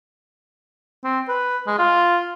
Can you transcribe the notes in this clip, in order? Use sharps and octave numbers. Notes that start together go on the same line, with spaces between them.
C4
B4
G#3
F4